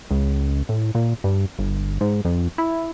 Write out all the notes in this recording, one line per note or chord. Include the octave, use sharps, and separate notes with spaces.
C#2
A2
A#2
G2
G1
G#2
F2
E4